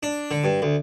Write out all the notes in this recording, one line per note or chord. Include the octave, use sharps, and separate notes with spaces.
D4
D3
G2
D2